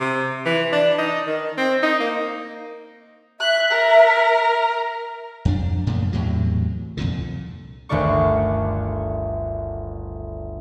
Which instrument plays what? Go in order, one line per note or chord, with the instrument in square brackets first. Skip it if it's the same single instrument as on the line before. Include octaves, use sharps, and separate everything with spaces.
[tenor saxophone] C3
E3
D4
D#4
D#3
C4
D#4
A#3
[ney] E5 [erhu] F#6
[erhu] A#4
[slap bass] F2 D4
F#2 A#2 C#3 A3
E2 A2 C3 F#3
C2 F2 A#2 D3
[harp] G1 D2 D#3 A3 D5 C#6